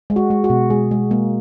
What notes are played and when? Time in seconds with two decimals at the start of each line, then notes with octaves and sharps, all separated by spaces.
0.10 G#3
0.16 F#4
0.30 G#3
0.44 F#4
0.50 B2
0.70 G#3 G#4
0.91 G#3
1.11 G#3 A#3